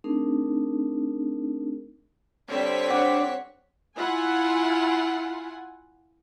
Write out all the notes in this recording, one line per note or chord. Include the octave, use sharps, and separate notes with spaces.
A3 C4 D4 D#4 G#4 A#4
D3 G3 C4 C#5 B6
D4 F#5
E4 F4 F#5 G#5